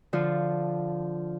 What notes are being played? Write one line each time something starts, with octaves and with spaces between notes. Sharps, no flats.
D3 F3 F4